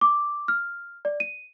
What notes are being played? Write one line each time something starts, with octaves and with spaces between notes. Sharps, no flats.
D6
F6
D5
D#7